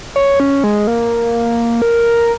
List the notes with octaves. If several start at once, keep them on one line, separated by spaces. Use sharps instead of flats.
C#5
C#4
G#3
A#3
A#4